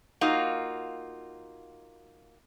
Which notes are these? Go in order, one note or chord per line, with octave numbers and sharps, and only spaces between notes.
A#3 D#4 F4 F#4